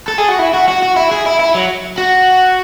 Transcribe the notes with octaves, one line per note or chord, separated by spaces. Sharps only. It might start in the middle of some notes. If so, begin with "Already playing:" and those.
A4
G#4
F#4
E4
F#4
F#4
F#4
E4
G#4
E4
E4
F#3
F#4